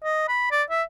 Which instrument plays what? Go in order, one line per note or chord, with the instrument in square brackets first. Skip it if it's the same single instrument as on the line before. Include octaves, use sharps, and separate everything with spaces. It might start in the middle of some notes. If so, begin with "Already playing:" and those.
[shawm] D#5
B5
D5
E5